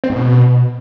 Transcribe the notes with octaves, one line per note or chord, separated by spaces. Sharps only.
C4
G#2
B2